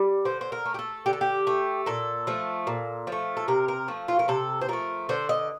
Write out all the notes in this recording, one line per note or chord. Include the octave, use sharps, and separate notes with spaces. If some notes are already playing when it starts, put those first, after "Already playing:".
Already playing: G3
D3 C5
C5
A#4
A3
G4
A4
D3 G4
A4
G4
A3
A#2 A4
F3 A3
A#2
F3
A3
A4
C3 A#4
A#4
F3 A3
F4
A#4
C3 A4
C5
F3 A3 A#4
D3 C5
D#5